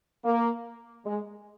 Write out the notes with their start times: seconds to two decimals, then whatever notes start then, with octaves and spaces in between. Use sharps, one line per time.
0.25 A#3
1.06 G#3